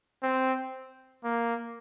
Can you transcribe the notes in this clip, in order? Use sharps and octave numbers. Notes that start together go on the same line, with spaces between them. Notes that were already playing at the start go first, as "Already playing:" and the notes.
C4
A#3